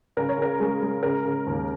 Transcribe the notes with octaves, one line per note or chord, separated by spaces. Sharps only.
C#2 A#4
C#5
C#3 A#4
G#3 G#4
G#3
C#3 A#4
C#3
D#2